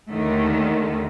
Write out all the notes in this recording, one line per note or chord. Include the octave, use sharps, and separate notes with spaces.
D#2 D3 D#3 A3